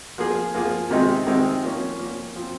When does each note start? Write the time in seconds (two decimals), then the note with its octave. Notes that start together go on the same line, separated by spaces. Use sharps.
0.18 F3 A#3 F4 G#4
0.54 F3 A#3 F4 G#4
0.91 C3 D#3 G#3 C4 D#4
1.26 C3 D#3 G#3 C4 D#4
1.63 F3 A#3 C#4
1.99 F3 A#3 C#4
2.36 F3 C4